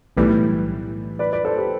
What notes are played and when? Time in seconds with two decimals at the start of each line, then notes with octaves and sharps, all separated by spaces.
0.17 B1 A2 E3 G3 G4 B4
1.19 B4 D5
1.33 B4 D5
1.45 A4 C5
1.58 G4 B4